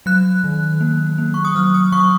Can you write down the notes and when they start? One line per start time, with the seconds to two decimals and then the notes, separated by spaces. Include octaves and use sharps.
0.06 F#3 F#6
0.44 D#3
0.81 A#3
1.18 A#3
1.34 C#6
1.45 D#6
1.55 F#3 F6
1.74 D#6
1.92 F#3 C#6